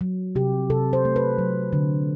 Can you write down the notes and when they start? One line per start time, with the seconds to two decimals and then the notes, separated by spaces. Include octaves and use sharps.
0.01 F#3
0.35 C3 G4
0.70 C3 A4
0.93 C5
1.05 A3
1.16 B4
1.38 F#3
1.73 D3